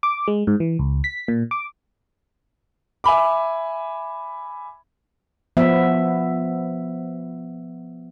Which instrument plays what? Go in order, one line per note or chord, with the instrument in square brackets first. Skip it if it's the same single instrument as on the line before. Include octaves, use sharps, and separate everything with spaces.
[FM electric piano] D6
G#3
G#2
E3
C#2
B6
A#2
D6
[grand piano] E5 G#5 B5 D6
[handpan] F3 B3 E5